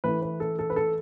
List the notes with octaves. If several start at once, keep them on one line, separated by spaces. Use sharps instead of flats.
E3 A3 E4 B4
B4
A4
A4
B4
A4